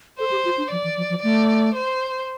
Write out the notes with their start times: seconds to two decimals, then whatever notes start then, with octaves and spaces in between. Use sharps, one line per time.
0.19 A4 C5
0.31 G4
0.45 F4
0.57 D4
0.71 F3 D5
0.84 E3
0.97 F3
1.10 F3
1.23 A3 D5
1.75 C5